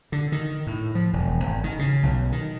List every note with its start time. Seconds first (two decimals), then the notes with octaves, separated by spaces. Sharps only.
0.12 D3
0.32 D#3
0.67 A2
0.95 F3
1.13 E1
1.44 G#1
1.64 D#3
1.79 C#3
2.03 B1
2.32 D#3